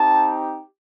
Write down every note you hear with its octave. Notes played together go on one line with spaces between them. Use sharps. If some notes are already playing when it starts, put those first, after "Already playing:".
Already playing: C4 D#4 G4 A5